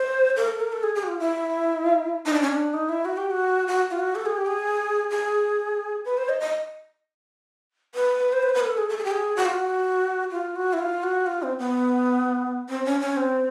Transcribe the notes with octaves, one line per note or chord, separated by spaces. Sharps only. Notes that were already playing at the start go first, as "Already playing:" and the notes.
Already playing: C5
A#4
A4
A#4
A4
G#4
G#4
F#4
F4
E4
D#4
D4
C#4
D4
D#4
E4
F#4
G4
F#4
F#4
F4
F#4
A4
G#4
G4
G#4
G#4
B4
C5
D#5
D#5
B4
C5
B4
C5
B4
A#4
A4
G#4
A4
G#4
G4
G#4
F#4
F4
F#4
F4
F#4
E4
F4
F#4
F4
C4
B3
C4
C#4
C#4
C4